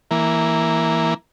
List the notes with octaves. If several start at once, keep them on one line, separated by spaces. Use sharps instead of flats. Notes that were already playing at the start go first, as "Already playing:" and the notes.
E3 A#3